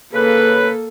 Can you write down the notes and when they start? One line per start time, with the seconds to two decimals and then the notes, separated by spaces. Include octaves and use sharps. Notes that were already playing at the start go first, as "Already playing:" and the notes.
0.14 C#3 A#3 A4 B4